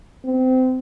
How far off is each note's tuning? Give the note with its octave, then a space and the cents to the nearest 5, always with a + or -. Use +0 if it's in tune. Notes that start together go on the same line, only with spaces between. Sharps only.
C4 -25